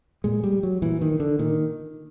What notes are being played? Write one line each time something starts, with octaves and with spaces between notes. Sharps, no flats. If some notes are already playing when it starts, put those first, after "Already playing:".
A#2 G#3
G3
F#3
A#2 E3
D#3
D3
A#2 D#3